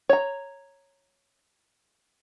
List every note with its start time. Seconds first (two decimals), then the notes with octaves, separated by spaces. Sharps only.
0.09 C#5 A#5